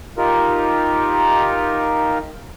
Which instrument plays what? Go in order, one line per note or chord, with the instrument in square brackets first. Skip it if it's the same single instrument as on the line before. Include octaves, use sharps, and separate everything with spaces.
[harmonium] D#4 F4 G4 A#4